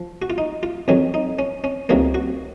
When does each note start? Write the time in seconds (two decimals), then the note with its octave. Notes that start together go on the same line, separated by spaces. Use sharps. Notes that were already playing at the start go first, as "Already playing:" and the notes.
Already playing: F3
0.22 F#4
0.30 F4
0.38 D#4
0.63 F4
0.88 F2 D#3 F#3 C#4
1.14 D#4
1.39 C#4
1.64 C#4
1.89 C#2 C3 D#3 F#3 A#3 D#4
2.14 F#4